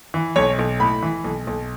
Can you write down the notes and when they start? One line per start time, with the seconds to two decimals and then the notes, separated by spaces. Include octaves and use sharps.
0.14 E3
0.36 B1 C#5
0.59 B1
0.80 A2 B5
1.03 E3
1.24 B1
1.47 B1